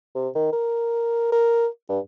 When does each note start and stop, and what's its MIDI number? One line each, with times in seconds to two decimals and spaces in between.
0.15 0.29 48
0.35 0.49 51
0.53 1.27 70
1.32 1.67 70
1.89 1.99 43